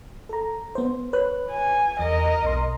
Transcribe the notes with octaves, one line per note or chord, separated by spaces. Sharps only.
A4 A#5
B3 C5
B4 C#5 F#6
G#5
E2 A#4 D#5
B1 B2 C6